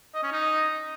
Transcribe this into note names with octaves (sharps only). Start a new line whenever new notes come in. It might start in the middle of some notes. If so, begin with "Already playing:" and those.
D#5
C#4
D#4